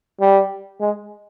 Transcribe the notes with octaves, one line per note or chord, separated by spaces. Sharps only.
G3
G#3